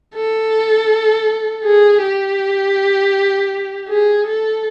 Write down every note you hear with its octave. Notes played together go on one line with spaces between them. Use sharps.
A4
G#4
G4
G#4
A4